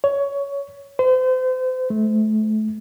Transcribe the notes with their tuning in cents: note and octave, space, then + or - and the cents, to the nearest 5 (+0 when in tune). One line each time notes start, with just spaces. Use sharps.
C#5 +15
C5 -35
A3 -30